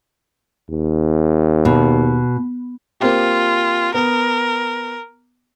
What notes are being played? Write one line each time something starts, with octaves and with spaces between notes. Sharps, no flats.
D#2
B2
A#3 C4 F4 G4
B3 A#4